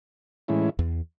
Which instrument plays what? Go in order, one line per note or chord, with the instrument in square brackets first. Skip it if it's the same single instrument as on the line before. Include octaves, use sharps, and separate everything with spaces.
[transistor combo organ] A2 E3 G#3 C#4 E4
[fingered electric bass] E2